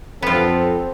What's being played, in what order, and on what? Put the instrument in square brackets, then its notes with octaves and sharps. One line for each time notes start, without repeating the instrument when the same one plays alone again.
[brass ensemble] F2 A4 [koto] B3 F4 [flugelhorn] C4